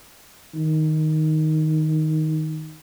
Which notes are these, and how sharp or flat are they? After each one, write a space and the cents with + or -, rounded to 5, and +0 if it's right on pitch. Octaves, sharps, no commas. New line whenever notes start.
D#3 +5